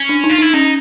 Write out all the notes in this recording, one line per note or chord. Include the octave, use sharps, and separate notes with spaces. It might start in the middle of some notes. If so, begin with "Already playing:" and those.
Already playing: C#4
D4
D#4
F4
D#4 E4
C#4 D#4